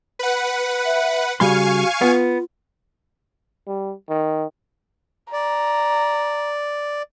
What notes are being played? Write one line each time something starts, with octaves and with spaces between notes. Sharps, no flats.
B4 F#5
E5
C#3 G3 F#4 F5 G#5 C6 C#6
B3 F4
G3
D#3
D5 A#5